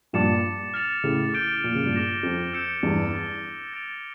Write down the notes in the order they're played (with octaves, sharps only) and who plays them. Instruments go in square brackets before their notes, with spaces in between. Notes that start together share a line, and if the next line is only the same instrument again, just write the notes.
[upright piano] G2 A#2 [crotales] D6 A6 C#7 E7
[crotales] F6 A6 C#7 F7
[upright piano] A2 C#3
[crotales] D6 G6 D7 G7
[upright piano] A#2
C#3
G2 A#2
[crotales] D6 F6 A#6 E7 G7
[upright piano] F2
[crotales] E6 G6 C#7 E7 G7
[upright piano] E2 G2
[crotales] A6 E7 G7
A6 D7 F7